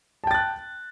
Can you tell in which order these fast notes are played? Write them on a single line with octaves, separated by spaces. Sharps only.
A5 G5 A6 F#6